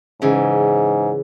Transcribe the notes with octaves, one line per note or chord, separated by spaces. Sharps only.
G#2 C#3 E3